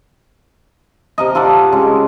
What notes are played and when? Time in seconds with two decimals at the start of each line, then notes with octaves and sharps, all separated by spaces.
1.18 C3 A#4 D#5
1.35 F4 A4 D5 F#5
1.72 C#3 G#3